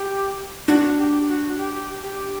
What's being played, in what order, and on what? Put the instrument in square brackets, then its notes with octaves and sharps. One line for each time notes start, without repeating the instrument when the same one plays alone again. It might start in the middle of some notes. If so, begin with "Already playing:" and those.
Already playing: [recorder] G4
[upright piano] D4 [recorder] F#4
[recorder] G4
F#4
G4
G4